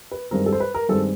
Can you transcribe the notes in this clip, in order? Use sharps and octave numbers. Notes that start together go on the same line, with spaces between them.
B4
G2 D#3 G#3 C4 A#4
A4
C5
B4
A#4
G2 D#3 G#3 C4 A4